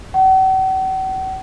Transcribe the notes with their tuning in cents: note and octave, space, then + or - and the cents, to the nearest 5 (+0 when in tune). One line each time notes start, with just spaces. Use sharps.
F#5 +45